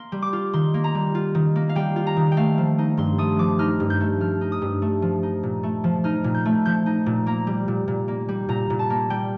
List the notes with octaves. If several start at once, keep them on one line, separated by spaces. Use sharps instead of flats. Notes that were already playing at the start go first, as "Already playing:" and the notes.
Already playing: A#3 C6
G3
D6
F4
D#3 C6
A#3
A#5
G3
F4
D#3
A#3
F5
G3 G5
F4
A#5
D#3
G5
A3 F5
F3
D#4
G2 C6
A3 D#6
F3 D6
D#4 F6
G2
G6
A3
F3 F6
D#4
D#6
G2
A3
F3
D#4
A#2
A3
F3
D#4 F6
A#2
G6
A3
F3 G6
D#4
A#2
A#3 A#5
G3
A#2
A#2
A#3
G3
A#2 A#5
A#2
A5
A#3
G3 G5